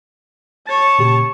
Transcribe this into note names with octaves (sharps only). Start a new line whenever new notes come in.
C#5 A5 A6
A#2 C#3 G4